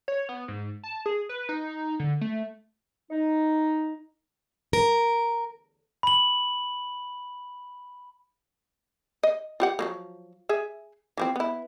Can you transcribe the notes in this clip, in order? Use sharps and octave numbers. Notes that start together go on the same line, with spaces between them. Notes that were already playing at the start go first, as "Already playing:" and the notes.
C#5
B3
G#2
A5
G#4
B4
D#4
D3
A3
D#4
A#4
B5 F#7
D#5
F4 G4 F#5
F3 F#3 A#3
G#4 E5
E3 F3 C4
B3 E4